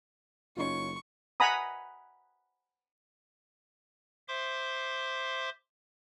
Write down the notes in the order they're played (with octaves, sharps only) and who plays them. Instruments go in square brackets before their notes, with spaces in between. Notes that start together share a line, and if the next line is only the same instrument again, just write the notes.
[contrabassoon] F#1 [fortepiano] C#4 D#4 F4 [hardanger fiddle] C#6
[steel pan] F#5 G#5 A#5 B5 D#6
[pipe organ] C5 E5 C6 D6